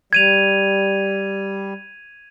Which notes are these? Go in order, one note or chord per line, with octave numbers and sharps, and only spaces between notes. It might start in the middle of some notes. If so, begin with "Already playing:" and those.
G3 G#6 D#7 F7